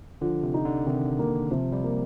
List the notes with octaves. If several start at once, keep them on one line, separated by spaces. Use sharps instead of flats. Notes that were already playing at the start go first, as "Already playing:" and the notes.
D3 F3
C3
D#4
D3
C3 D#3
A#3
C3 F3
G3
A#3